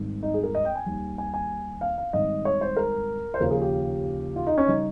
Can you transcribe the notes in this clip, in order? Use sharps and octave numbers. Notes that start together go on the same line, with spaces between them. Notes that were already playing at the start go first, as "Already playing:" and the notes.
Already playing: G#1 G#2 D#3 G3
D#4
G#4
A#4
D#5
G5
G#5
D#2 D#3 G3
G#5
G#5
F5
F5
G#1 G#2 D#3 G3 D#5
C#5
C5
A#4
C5
D#2 C#3 F3 A#4
G#4
G4
F4
D#4
C#4
C#3 G3 D#4